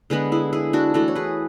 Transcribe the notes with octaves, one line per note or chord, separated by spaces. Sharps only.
D3 G#3 B3 G#4 B4
E4 G#4
E4 G#4
D4 F#4
E3 A3 F#4 A4
C#5
G#4 B4